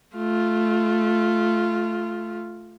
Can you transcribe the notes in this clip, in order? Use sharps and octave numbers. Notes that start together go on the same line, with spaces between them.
A3 F4